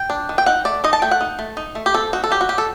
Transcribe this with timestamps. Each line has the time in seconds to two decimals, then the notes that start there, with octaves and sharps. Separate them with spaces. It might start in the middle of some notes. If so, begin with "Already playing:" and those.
Already playing: G5
0.10 D4
0.29 D#3
0.38 G5
0.46 D#4 F#5
0.65 A3 D5
0.84 D#4 D#5
0.93 A5
1.02 A3 G5
1.11 F#5
1.21 D#4
1.39 A3
1.57 D#4
1.75 A3
1.86 G4
1.94 C4 A4
2.13 D#4 F#4
2.24 A4
2.31 F#3 G4
2.41 F#4
2.49 F#3 G4
2.58 A4